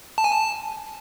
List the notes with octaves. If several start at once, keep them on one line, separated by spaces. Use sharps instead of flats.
A5
G#5
A5